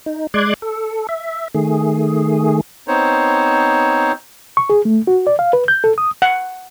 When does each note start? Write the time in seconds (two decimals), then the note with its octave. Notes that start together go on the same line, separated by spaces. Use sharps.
0.06 D#4
0.34 G#3 D5 C6 D6 F#6 G#6
0.62 A4
1.09 E5
1.54 D#3 A3 G#4
2.88 B3 C4 D#4 C5 C#5
4.57 C#6
4.70 G#4
4.85 A3
5.07 F#4
5.27 D5
5.39 F5
5.53 B4
5.68 G6
5.84 A4
5.98 D#6
6.22 F#5